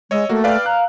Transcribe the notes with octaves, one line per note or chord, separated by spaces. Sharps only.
G#3 C#5 D#5 E6
A3 A#3 F#4
B4 D5 F5 G5
A#5 F#6